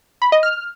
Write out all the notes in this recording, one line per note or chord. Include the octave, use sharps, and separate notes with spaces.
B5
D#5
F6